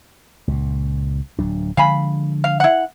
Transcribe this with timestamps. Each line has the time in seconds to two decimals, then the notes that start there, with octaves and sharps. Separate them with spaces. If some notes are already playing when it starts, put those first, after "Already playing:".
0.48 C#2 A#2
1.39 D1 F#3 D4
1.77 D3 F3 G#3 F5 G#5 B5
2.44 F5
2.60 E4 F#5